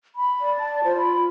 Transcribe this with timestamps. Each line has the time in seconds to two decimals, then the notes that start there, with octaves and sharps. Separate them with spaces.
0.16 B5
0.41 D5
0.59 A5
0.84 F4 C5
0.97 B5